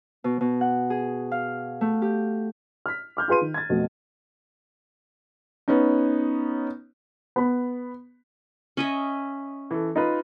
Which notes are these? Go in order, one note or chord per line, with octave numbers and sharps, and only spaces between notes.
B2
B2
F#5
G#4
F5
A3
G4
F6 B6
D6 F6 G6
F4 G#4 B4 C6 D#7
D#3
G#6 A6
F2 B2 A3
B3 C#4 D#4
B3 B5
C#4 D#5 E5
E3 A4
D#4 F4 B4